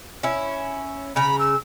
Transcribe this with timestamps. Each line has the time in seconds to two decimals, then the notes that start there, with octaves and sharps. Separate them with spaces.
0.23 C#4 E4
1.16 C#3 A#5 B5
1.39 E6